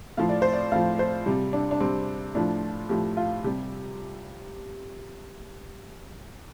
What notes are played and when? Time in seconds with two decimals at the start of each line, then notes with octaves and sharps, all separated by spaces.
0.17 A2 F3 F5
0.29 D5
0.42 C5
0.53 D5
0.72 A2 F3 F5
0.99 C5
1.26 C3 G3
1.53 D4
1.71 D4
1.80 C3 G3 C4
2.35 A2 F3 D4
2.89 A2 F3 G4
3.17 F4
3.44 C3 G3 G4